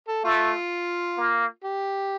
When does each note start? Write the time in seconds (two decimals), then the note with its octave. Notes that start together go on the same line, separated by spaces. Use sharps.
0.08 A4
0.24 A3 F4
1.17 A#3
1.64 G4